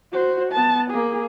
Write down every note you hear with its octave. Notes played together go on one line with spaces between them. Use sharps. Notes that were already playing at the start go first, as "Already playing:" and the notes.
F#4 C5
B3 A5
A#3 G#4